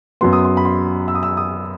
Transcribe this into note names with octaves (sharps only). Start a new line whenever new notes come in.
F#2 F#3 B3 C6
D#6
C6
B5
C6
E6
D#6
E6
D#6